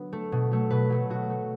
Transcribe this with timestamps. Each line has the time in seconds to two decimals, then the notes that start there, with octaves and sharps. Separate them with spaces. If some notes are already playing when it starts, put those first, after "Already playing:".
Already playing: D3 F#3 B3 B4
0.13 A3
0.32 B2
0.51 F#3 A3
0.70 B2 B4
0.90 F#3 A3
1.10 B2 F#4
1.30 A3